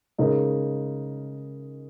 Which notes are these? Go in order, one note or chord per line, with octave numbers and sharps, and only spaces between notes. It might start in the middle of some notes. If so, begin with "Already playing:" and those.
C#3 G#3 D#4 A#4